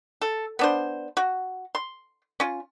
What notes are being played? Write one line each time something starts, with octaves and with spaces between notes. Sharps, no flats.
A4
B3 D4 C5
F#4
C6
C#4 F4